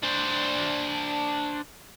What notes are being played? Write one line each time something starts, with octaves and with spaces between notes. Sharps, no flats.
D4 C5